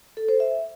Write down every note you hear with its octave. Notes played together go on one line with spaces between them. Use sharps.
A4
C5
E5